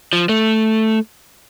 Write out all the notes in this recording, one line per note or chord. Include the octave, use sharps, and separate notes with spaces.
F3
A3